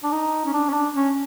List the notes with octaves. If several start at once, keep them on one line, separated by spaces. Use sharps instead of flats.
D4
D#4
C#4
D4
C#4
D4
C#4